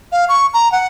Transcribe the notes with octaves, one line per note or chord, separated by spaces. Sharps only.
F5
C#6
A#5
F#5